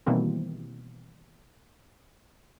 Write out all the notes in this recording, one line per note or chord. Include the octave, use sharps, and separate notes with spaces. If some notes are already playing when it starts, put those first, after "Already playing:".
B2 D#3 E3 G3 A#3 C4